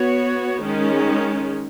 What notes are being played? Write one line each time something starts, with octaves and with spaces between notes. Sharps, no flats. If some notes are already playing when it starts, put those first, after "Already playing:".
Already playing: B3 F#4 C#5
D#3 G#3 C#4